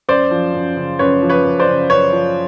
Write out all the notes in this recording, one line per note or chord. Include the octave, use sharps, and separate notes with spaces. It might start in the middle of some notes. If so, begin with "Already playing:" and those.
F#2 C5 D5
F3
F#2
C#3
F#2 B4 C#5
F3
B4 C#5
F#2
C5 D5
C#3
F#2 B4 C#5
F3